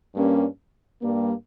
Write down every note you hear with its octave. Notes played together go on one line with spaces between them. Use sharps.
G2 G3 A#3 C#4
G2 G3 A#3